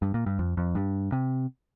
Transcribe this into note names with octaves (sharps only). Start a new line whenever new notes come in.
G2
A#2
G2
F2
F2
G2
C3